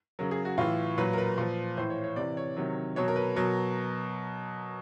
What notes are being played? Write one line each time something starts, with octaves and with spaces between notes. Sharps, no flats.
C#3 F#3 A#4
G#4
F#4
A2 E3 F4
A#2 F#3 B4
A#4
B4
A#2 F3
A2 E3 C5
C#5
C#5
C3 E3 D5
C#5
C3 D#3 F#3
B2 F#3 C#5
A#4
B4
B2 F#3 A#4